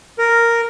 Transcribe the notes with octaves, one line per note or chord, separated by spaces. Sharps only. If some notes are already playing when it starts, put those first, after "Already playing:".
A#4